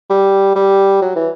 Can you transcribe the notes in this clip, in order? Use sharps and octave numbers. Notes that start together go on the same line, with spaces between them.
G3
G3
F#3
E3